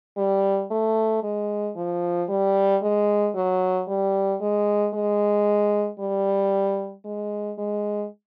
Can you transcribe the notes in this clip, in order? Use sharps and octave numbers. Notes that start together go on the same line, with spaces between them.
G3
A3
G#3
F3
G3
G#3
F#3
G3
G#3
G#3
G3
G#3
G#3